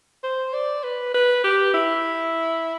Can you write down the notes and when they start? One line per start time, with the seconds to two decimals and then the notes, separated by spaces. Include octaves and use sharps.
0.23 C5
0.53 D5
0.83 B4
1.14 B4
1.44 G4
1.74 E4